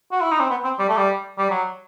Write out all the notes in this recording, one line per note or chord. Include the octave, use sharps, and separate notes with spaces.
F#4
E4
D#4
C4
B3
C4
G3
A3
G3
G3
F#3